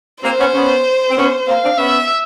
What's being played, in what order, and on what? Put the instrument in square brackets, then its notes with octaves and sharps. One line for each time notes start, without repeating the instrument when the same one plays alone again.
[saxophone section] A#3 C4 [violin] C5
[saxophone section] B3 C#4
B3 C#4
C4
B3 C#4
[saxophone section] A#3 C4 [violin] F5
[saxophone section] C4 D4
[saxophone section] B3 C#4 [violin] E5